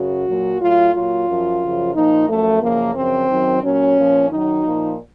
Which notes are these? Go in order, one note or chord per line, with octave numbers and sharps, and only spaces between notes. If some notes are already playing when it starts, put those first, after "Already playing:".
Already playing: F#2 C#3 F#4
A#2 F#3
A2 F#3 F4
A#2 F#3 F4
F#2 F3
F#2 C#3 F3
A#2 F3 D#4
F#2 F3 A3
F#2 C#3 F3 A#3
F#2 C#3 F3 C4
F#2 D#3 F#3
A#2 F#3 C#4
A#2 F3
F#2 D#3 F#3 D#4
A#2 F3